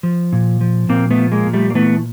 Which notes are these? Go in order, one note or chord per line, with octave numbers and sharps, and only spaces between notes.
F3
A#2
F3
A#2 A#3 C4
A3 B3
F3
G#3 A#3
A#2
G3 A3
A#3
E3 A3 B3